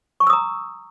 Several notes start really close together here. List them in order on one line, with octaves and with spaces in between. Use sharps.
C#6 G#5 E6 D#6 A#5